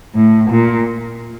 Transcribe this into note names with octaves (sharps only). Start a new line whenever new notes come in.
A2
A#2